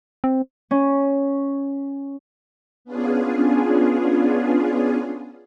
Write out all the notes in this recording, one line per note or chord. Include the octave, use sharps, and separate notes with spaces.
C4
C#4
B3 C#4 D4 F4 G#4